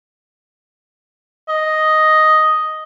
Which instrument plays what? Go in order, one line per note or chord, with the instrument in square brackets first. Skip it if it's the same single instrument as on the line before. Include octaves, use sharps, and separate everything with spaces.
[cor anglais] D#5